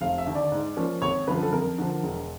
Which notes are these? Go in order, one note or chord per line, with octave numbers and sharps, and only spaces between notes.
F1 F5
E5
D#2 D3
D5
G#2
F3 A#3 C#4
G#1 C#5
F#2 D3 F3 B4
A4
F2 A#4
D3 F3
E1